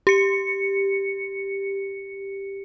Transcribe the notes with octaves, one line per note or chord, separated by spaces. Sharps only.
G4 C#7